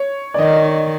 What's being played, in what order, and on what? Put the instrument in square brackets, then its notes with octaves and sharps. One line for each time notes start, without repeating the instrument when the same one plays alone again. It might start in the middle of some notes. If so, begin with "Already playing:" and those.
Already playing: [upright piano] C#5
D5
[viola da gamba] D#3 [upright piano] D#5